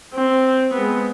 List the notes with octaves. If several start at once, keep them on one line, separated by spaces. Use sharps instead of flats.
C4
G#3 B3